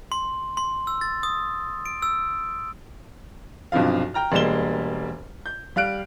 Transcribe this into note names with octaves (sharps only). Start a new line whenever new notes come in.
C6
C6
E6
A6
D#6
D7
E6
B1 G2 C3 F3 F5
G5 A#5 F6
E1 G3 G#3 A#3 E7 G7
G6
G3 F5 F#6 D7